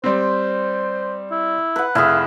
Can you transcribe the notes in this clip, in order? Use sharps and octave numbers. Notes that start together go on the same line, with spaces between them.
G3 C4 C5
E4
B4 F#5
F1 E4 G#4 F5